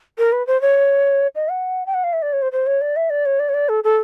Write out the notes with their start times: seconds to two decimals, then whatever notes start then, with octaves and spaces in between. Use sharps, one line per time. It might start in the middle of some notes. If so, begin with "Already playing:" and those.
0.18 A#4
0.32 B4
0.47 C5
0.61 C#5
1.35 D#5
1.50 F#5
1.86 G5
1.94 F#5
2.04 F5
2.13 E5
2.22 D5
2.33 C#5
2.42 C5
2.52 C5
2.66 C#5
2.81 D5
2.96 E5
3.10 D5
3.26 C#5
3.39 D5
3.49 C#5
3.54 D5
3.69 A4
3.84 A4